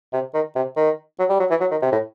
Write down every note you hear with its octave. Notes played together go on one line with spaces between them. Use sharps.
C3
D#3
C3
D#3
F#3
G3
F#3
E3
F#3
D#3
C3
A2